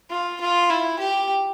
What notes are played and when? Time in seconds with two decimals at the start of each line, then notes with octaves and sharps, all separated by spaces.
0.10 F4
0.41 F4
0.70 E4
0.99 G4